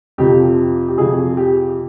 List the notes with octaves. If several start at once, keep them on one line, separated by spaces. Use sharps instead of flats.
F2 C3 F3 G4
G4
F2 C3 F3 G#4
G4